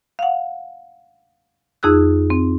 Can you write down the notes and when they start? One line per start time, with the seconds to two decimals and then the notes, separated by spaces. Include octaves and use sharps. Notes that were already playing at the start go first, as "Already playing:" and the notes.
0.19 F5 F#5
1.83 F2 D#4 G#4 E6 F#6
2.30 C4